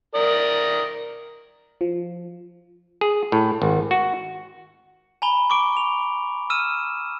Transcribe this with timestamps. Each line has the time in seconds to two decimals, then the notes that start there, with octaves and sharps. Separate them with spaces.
0.15 A#4 D5 D#6
1.81 F3
3.01 G#4
3.32 A2
3.62 G#1
3.91 F#4
5.22 G#5 A#5 B5 G7
5.50 C#6 D6 D7
5.77 F7
6.50 E6 F6 D#7 E7